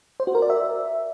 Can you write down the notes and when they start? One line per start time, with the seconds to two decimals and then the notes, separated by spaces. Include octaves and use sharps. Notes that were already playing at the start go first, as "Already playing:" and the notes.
0.20 C5
0.27 F#4
0.35 A#4
0.42 D5
0.50 E5